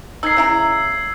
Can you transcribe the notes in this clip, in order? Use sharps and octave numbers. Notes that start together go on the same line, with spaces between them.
D#4 A#4 E6 G#6 C7
C#3 E4 A#5